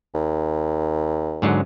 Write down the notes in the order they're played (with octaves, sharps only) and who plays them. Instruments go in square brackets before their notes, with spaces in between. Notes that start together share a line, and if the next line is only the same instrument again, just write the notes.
[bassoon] D#2
[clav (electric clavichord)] G#2 D3 F#3